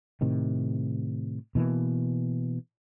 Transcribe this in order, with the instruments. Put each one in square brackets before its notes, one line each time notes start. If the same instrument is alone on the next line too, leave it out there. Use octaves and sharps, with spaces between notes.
[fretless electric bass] A2 C3 D#3
B2 E3 A#3